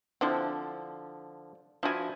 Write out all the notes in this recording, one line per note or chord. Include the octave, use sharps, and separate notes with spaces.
D3 F3 C4 D4 E4
F3 D4 E4 F#4 G#5